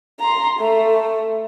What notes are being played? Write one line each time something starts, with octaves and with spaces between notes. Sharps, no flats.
A#5 C6
A3